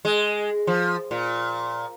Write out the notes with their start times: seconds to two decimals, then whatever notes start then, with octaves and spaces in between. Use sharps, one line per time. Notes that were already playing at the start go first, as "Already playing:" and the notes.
0.05 G#3
0.67 F3
1.11 A#2